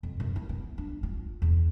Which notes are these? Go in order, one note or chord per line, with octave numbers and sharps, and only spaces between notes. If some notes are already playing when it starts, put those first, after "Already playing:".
F2
F#2
E4
B3
D4
F4
E2